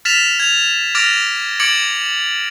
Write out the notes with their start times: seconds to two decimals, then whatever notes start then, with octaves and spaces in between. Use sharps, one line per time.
0.05 F6 A6 B6 E7 F7
0.40 G#6 F7
0.95 D6 F6 A6 A#6 D7 F7
1.60 D6 G#6 A6 C#7 D7 F#7